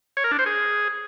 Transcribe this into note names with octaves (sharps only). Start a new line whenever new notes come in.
C#5
A#4
D4
C5
G#4